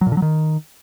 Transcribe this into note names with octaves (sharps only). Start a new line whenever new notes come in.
F#3
A#2
D3
F#3
D#3